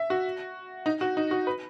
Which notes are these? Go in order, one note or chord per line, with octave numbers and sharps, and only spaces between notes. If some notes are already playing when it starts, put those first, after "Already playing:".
Already playing: E5
F#4
D#4
F#4
D#4
F#4
B4